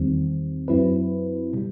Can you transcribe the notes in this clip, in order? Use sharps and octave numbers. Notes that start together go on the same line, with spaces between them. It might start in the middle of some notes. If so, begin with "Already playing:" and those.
Already playing: E2 D#3 G3 C4
F#2 F#3 C4 E4 B4
B2 G3